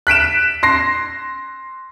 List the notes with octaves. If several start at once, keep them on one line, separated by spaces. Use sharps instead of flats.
F#6 B6 D7 E7
C6 A#6 C7